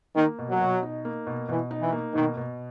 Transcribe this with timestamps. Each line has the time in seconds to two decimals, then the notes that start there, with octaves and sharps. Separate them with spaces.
0.15 D#3 A#3
0.39 B2
0.49 F#3
0.60 B2
0.83 D#4
1.05 A#3
1.27 B2
1.49 B2 E3
1.71 D#4
1.81 E3
1.92 A#3
2.14 B2 D#3
2.37 B2